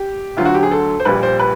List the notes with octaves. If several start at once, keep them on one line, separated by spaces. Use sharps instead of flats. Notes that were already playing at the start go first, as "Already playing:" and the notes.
Already playing: G4
D2 D3 F#3 F4
F#4
G4
G#4
A4
C5
A#1 A#2 G3 B4
C5
B4